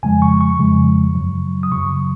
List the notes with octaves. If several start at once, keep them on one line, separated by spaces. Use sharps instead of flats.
F2 C#3 F3 G#3 G#5
C#6
C#6
F2 C#3 F3 G#3
F#2 C#3 F#3
D#6
F#2 C#3 F#3 C#6